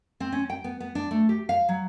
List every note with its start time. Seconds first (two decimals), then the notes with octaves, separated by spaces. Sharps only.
0.20 C4
0.32 C#4
0.50 G5
0.64 B3
0.80 B3
0.95 D4
1.11 A3
1.29 G4
1.49 F5
1.69 F#3